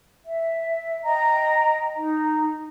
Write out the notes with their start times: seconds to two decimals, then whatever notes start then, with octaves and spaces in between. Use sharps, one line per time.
0.25 E5
1.04 D#5 G5 A#5
1.94 D#4